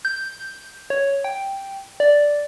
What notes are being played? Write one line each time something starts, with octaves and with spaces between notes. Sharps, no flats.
G6
C#5
G5
D5